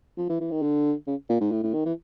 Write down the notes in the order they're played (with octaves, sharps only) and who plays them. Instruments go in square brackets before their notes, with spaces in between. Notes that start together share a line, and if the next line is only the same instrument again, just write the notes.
[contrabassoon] F3
E3
E3
D#3
D3
C#3
A#2
G#2
A2
A2
D#3
E3